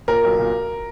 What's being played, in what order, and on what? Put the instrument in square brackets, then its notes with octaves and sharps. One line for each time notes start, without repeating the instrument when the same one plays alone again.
[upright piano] A#2 A#4
B1
A#2